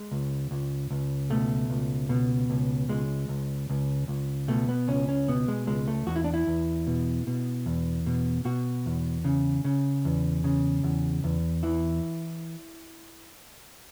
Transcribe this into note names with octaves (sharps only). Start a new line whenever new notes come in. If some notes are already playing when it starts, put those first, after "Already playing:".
Already playing: G#3
C#2
C#2
C#2
B2 A3
C#2
B2
C#2
C#2 G#3
C#2
C#2
C#2
B2 A3
B3
C#2 C#4
C#4
B2 B3
G#3
C#2 G#3
A3
E2 F#4
E4
D4
E4
E2
B2
B2
E2
B2
B2 F#4
E2
C#3
C#3
E2
C#3
E2
E2
E3 E4